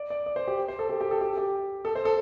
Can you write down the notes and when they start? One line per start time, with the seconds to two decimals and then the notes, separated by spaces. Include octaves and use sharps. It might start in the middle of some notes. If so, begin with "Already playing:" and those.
Already playing: D5
0.10 D5
0.26 D5
0.36 C5
0.48 G4
0.68 C5
0.79 A4
0.89 G4
1.01 G4
1.11 A4
1.21 G4
1.37 G4
1.85 A4
1.95 C5
2.05 A4